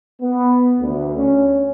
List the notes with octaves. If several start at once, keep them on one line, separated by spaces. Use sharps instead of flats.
B3
D2
C#4